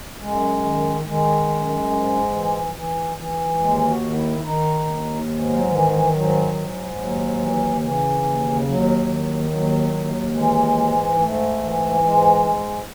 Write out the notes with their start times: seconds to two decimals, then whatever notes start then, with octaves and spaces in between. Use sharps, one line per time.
0.21 F#2 G#3
0.63 D#3
1.05 D#3 G#3
1.47 F#2
1.89 G#2
2.32 E3
2.73 E3
3.16 E3
3.58 D#2 G#3
3.86 F#4
4.01 D#3
4.15 E4
4.42 D#3 D#4
4.85 D#2
5.27 G#2
5.48 F#3
5.69 D#3 E3
5.90 E3
6.11 G#2 F#3
6.54 G#2
6.96 D#2 F#3
7.38 E3
7.80 C#3 E3
8.23 D#2
8.64 D#2 F#3
9.07 D#3
9.49 D#2 F#3
9.91 D#2
10.34 E3 G#3
10.75 G#2
11.18 G#2 A3
11.60 E3
12.02 G#2 G#3
12.45 G#2